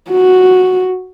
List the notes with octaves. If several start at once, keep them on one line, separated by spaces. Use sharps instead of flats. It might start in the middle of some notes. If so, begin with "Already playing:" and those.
F#4